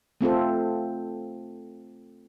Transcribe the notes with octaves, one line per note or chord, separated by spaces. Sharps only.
A3 C4 F4 A4